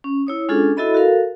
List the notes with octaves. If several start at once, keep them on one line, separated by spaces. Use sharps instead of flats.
C#4
E4 C#5 D#6
G#3 C#4 D4 F4 G#4 A4
E4 F#4 A4 D#5 E5 B5
F#4 A4 A#4 F5